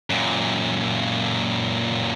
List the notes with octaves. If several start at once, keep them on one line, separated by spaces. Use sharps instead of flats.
F#2 A#2